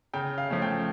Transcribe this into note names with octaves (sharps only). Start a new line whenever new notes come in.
C#3 G5
F5
F3 A3 C#4
G5